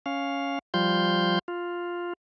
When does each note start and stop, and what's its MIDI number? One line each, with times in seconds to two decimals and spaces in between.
0.06 0.59 61
0.06 0.59 77
0.74 1.39 53
0.74 1.39 55
0.74 1.39 65
0.74 1.39 84
0.74 1.39 91
1.48 2.13 65